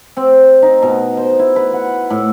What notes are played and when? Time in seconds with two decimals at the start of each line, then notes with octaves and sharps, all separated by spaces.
0.17 C4
0.62 D#4
0.83 B2
1.17 C5
1.39 E4
1.56 B4
1.73 F#5
2.10 A2